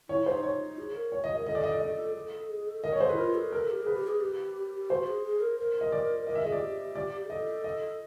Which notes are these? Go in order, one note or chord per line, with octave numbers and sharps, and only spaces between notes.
E4 C#5
D#4 C5
C#5
G#4
A#4
C#5
D#5
A#4 D#5
A4 D#5
D5
D#5
D5
D#5
A4
A4
G#4
A4
A#4 D#5
C#5
A4 C5
E4 B4
F4 A#4
A4
A4 A#4
G4
G#4 B4
G4
G#4
G4
G4
G4
F#4 C5
G#4
G#4
A#4
A#4
D#5
D5
A#4 D#5
E5
G#4 D#5
D5
G4
D5
G#4
A4 D#5
D#5